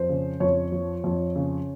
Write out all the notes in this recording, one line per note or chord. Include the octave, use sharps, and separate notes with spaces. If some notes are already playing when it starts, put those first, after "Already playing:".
Already playing: F2 C5
C#3
F2 C#5
F3
F2
C#3